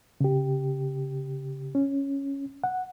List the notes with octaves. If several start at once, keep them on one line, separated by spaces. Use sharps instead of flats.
C#3 G4
C#4
F#5